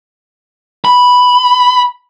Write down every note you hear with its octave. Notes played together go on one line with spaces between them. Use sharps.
B5